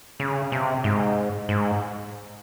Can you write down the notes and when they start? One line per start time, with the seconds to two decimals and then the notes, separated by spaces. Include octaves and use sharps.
0.20 C#3
0.52 C3
0.84 G#2
1.49 G#2